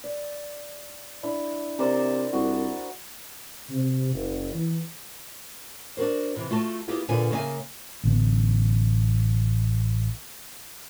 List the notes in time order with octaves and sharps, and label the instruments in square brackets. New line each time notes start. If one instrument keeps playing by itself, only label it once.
[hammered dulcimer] D5
D4 E4
[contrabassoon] C3 [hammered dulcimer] A#4 C5 D5
[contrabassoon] C2 [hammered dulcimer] F#4
[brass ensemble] C3
F#1
E3
[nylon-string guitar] D4 F#4 A#4 C5
C3 E3
A3 F4 F#4 A5
A#3 B3 E4 F4 G4 G#4
A#2 D3 B3 F4 B4 G#5
C#3 A#3 C#5 E5 G#5
[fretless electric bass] A1 D3 B3